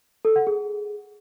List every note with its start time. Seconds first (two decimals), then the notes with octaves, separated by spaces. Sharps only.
0.25 A4
0.36 F#5
0.47 G#4